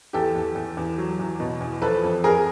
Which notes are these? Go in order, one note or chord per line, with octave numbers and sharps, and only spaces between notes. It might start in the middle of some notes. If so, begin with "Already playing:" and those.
E2 G4 A4
E2
E2
E2
F#3
E2
B2
E2
F3 A4 B4
F2
F2 G#4 A#4